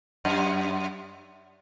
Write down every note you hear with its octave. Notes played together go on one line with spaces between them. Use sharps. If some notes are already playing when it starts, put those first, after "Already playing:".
F#2